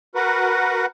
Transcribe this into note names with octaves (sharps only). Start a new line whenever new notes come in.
F#4 A#4 B4 F#5